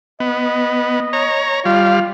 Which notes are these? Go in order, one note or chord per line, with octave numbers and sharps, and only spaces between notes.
B3 D#5
C#5 A#5
G3 F4 F5